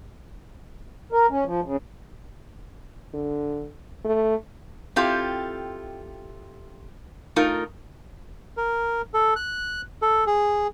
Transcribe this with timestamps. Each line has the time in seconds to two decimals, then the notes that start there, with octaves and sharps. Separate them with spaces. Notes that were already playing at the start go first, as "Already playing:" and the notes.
1.12 A#4
1.30 C#4
1.45 F3
1.64 C#3
3.14 D3
4.04 A3
4.96 C4 E4 F4 G4 A4
7.36 A3 D#4 F4 A#4
8.57 A#4
9.14 A4
9.36 F#6
10.02 A4
10.27 G#4